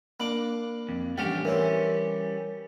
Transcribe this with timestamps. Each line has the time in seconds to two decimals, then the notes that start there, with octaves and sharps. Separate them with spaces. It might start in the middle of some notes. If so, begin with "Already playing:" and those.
0.20 A#3 D4 B5 D6 F#7
0.89 F2
1.18 A1 D3 G3 C#4 G4 F5
1.45 E3 E4 A#4 C#5 C6